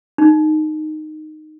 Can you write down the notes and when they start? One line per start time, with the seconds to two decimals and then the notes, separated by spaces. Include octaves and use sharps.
0.18 D#4